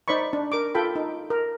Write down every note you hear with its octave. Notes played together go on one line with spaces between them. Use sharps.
D#4 C5 D5 B5 C#6
D4
A#4 D6
F4 A4 G5 B5
D#4
A#4